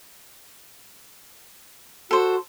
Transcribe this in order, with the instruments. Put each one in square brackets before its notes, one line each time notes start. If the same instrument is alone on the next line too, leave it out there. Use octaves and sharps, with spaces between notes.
[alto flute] F#4 [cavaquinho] A4 C5